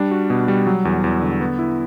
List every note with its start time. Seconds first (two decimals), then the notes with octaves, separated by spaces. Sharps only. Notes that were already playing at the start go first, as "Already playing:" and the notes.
Already playing: G3 D4
0.11 F#4
0.30 B2
0.48 G3
0.67 F#3
0.85 E2
1.04 E2
1.22 D3
1.41 B3
1.59 E4